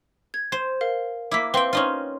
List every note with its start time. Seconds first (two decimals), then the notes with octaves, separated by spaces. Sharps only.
0.34 G#6
0.52 C5
0.81 A#4 F5
1.31 A#3 E4 D6 E6 B6
1.54 C4 B4 F5 G5 C6
1.73 C#4 D#4 F4